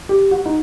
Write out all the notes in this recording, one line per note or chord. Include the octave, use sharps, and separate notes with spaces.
G4
F#4
D#4